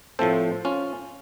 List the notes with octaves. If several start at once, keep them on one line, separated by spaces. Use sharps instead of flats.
A2 F3 A3 C4 A4 C5
C#4 F4